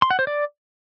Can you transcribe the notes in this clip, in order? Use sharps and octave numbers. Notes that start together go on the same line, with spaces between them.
C6
F#5
C5
D5